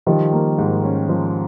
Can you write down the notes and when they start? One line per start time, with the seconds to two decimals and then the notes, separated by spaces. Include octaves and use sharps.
0.07 D#3 F3 G3
0.32 A#3
0.58 G#2
0.83 C#4
1.09 F3